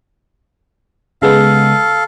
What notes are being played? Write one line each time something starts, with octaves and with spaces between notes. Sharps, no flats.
C#3 G#3 B3 A4 F5